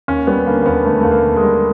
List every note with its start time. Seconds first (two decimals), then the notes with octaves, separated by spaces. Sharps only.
0.08 D#2 C#4
0.27 G3 B3
0.46 D3 A#3
0.61 A#3
0.66 D#2 B3
0.85 D3 A3
1.01 D#2 A3
1.11 A#3
1.24 D#2
1.36 G#3
1.43 G3